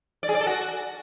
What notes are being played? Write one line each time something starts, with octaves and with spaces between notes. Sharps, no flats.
D5
G#4
D5
A4
F#4